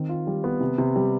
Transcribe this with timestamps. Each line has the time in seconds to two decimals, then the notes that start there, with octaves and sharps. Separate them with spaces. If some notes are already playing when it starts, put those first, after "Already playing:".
Already playing: D#3 C4
0.09 F4
0.27 G3
0.44 B3
0.61 C3
0.78 C3
0.96 G3